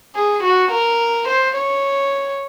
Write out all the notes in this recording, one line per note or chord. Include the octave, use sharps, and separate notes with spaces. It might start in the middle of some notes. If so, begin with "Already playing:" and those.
G#4
F#4
A#4
C5
C#5